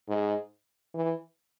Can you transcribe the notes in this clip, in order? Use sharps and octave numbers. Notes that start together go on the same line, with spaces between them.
G#2
E3